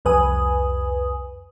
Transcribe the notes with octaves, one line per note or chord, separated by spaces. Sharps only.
C2 F2 B4 G#5 D#6